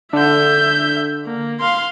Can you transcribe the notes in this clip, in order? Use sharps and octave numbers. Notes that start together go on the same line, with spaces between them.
D3 E5 G6
A#3
F5 C6